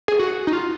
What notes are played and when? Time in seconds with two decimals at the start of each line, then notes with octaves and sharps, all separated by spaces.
0.08 G#4
0.19 F#4
0.47 D#4
0.53 F4